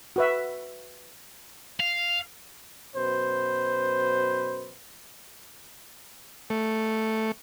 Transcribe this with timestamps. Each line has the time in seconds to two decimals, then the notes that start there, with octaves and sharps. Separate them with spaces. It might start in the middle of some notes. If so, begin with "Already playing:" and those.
0.16 F#4 B4 E5
1.80 F5
2.96 F#2 B2 B4 C5
6.50 A3